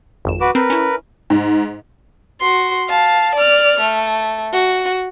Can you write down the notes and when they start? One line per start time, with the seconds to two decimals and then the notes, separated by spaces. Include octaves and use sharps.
0.25 G#1 F2 E7
0.41 F#4 B4 D6
0.55 C4 A#4 B4
0.70 C#4 E4
1.30 G#2
2.40 F#4 C6
2.89 F5 A5
3.35 D5 F6
3.80 A3
4.53 F#4